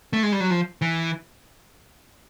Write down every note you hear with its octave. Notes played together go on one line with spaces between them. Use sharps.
A3
G#3
G3
F#3
F3
E3